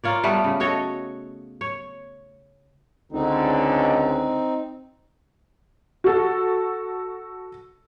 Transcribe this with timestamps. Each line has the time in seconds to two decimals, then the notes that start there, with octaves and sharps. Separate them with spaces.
0.04 A#3 F4 C#5 D5
0.24 G3 A3 B3
0.44 C#3
0.60 F#4 A4 C#5 D#5
1.61 C#5
3.12 C#2 D3 C4 D#4
6.04 F#4 A4